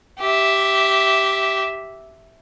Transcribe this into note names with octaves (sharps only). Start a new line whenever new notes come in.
G4 E5